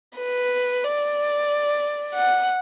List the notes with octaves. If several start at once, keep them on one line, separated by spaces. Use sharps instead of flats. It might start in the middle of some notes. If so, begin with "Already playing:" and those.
B4
D5
F#5